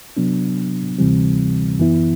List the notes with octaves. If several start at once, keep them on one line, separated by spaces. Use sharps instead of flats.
C3 F#3 B3 D4
D2 C3 E3 G3 C4
F#2 E3 B3 E4